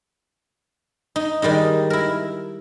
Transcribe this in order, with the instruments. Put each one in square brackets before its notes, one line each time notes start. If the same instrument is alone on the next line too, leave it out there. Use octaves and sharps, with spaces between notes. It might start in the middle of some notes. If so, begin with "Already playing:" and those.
[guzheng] D#4
D#3 G3 G#3 D#4
E4 A#4